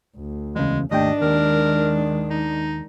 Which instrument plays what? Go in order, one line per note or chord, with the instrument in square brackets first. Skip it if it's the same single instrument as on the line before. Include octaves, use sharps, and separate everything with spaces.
[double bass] D2
[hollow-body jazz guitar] E2 C#3 [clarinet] G#3
[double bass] G#1 [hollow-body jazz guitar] D#2 A3 G5 [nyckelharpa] D4 [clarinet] D#5
[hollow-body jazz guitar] D#2 [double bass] D#3 G#3 [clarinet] A#4
[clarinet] D#4